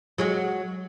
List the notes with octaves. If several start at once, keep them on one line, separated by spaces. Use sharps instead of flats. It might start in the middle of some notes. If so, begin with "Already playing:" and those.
F#3 G#3 F#4